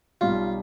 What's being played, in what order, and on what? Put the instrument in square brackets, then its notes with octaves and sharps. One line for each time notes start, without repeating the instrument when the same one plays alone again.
[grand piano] B1 B2 G3 [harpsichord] F4